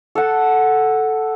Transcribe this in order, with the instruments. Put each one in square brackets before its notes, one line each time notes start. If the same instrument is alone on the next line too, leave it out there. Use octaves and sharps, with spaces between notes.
[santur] A4 F#5